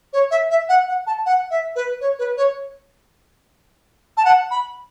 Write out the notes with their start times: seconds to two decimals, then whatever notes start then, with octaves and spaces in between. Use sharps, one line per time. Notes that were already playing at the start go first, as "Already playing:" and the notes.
0.13 C#5
0.31 E5
0.51 E5
0.69 F#5
0.88 F#5
1.07 A5
1.26 F#5
1.51 E5
1.76 B4
2.01 C#5
2.19 B4
2.37 C#5
4.17 A5
4.25 F#5
4.51 B5